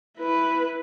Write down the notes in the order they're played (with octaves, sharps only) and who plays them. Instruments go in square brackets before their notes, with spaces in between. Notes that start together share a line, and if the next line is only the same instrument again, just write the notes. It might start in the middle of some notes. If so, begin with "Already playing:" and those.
[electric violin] E4 B4